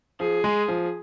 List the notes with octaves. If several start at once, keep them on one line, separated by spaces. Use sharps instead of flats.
F3 G#4
G#3
F3